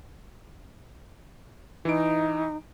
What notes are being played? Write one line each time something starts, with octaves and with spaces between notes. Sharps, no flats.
E3 D#4 D7